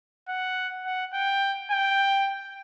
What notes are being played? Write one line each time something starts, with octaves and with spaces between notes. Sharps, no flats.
F#5
F#5
G5
G5